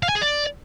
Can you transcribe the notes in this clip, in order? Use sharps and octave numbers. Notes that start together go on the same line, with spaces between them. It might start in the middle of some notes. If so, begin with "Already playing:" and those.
F5
G#5
G#4
D5